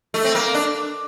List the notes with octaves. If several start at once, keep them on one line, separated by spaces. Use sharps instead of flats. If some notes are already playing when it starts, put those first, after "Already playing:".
A3
C4
A#3
D4